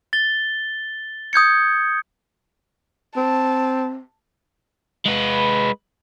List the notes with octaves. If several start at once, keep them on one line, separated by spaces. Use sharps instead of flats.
A6 G7
D#6 G6 G#6 C#7
C4 A5
G#3 B4